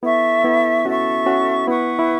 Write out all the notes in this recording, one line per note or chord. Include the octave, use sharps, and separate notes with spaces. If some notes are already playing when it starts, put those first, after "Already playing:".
B3 E4 A4 E5 C#6
B3 E4
C#4 F#4 A4 E5 C#6
C#4 F#4
B3 E4 B4 F#5 C#6
E4